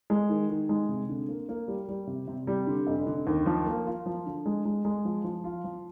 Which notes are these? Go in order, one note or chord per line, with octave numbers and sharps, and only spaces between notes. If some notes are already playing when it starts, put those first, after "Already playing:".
G#3
D#3
D#3
G#3
C3
D3
A#3
A#3
G3
G3
C3
C3
G3
D3
F1
D3
D#2
F3
A#3
F4
F3
D3
G#3
G#3
G#3
F3
F3
F4
F3